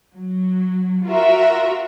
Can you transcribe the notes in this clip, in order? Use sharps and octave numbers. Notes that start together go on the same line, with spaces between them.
F#3
F4 F#4 A#4 E5